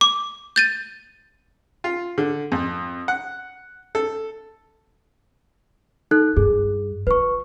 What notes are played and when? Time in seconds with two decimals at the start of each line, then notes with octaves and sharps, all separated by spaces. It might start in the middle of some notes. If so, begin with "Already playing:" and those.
0.01 D6
0.56 G6 A6 D#7
1.84 F4
2.18 D3
2.52 F2
3.08 F#5
3.95 A4
6.11 D#4 A4 F#6
6.37 G2 G#4
7.07 F4 B4 C#6